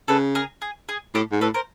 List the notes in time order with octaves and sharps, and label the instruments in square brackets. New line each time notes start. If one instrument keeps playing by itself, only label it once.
[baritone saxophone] C#3 [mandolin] A4 B4
[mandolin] G#4 A#4
G#4
G#4
[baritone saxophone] A2 [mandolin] G4 A4
[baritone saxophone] G#2
[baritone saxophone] A2 [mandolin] A4 B4
[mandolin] A#4 C5